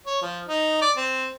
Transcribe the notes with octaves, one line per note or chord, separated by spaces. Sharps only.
C#5
F3
D#4
D5
C4